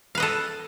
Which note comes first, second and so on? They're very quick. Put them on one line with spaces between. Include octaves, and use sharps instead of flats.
F5 B4 D#5 A4